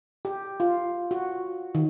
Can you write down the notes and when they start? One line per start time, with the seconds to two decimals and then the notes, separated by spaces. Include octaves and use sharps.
0.25 G4
0.60 F4
1.11 F#4
1.75 D#3